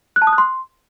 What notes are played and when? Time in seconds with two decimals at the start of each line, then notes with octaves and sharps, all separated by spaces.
0.16 F#6
0.22 A5
0.27 D#6
0.33 F#6
0.38 C6